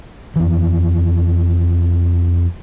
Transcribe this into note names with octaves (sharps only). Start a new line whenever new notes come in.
F2 E3